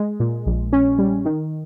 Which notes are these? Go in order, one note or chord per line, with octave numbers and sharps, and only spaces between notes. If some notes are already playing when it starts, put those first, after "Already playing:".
Already playing: G#3
A#2
A#1
C#4
G3
D#3